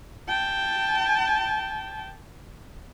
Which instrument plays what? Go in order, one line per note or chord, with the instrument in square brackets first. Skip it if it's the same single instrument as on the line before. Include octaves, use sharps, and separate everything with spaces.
[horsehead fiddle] G5 A5